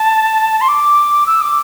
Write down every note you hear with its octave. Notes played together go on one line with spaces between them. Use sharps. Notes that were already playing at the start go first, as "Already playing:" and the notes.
Already playing: A5
C6
D6
E6
D6